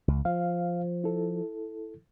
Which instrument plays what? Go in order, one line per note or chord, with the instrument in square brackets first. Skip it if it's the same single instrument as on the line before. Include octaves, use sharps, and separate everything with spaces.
[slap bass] C#2
[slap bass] F3 [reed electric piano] F5
[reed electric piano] E4 A4